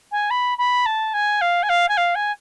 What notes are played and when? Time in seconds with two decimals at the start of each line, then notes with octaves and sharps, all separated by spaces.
0.12 G#5
0.30 B5
0.58 B5
0.86 A5
1.14 G#5
1.41 F5
1.63 G#5
1.69 F5
1.89 G#5
1.97 F5
2.15 G#5